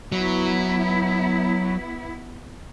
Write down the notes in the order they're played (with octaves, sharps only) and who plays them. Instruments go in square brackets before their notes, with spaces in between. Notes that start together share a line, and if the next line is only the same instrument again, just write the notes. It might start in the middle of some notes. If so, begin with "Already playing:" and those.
[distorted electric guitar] F#3 [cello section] B3 E4